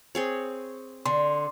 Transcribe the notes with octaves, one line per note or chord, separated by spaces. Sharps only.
C4 G#4 C#5
D3 C6